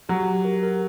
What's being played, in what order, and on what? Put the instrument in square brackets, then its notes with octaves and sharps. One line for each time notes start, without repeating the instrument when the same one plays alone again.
[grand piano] F#3 [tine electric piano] G4
[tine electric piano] G4
A#4
A#4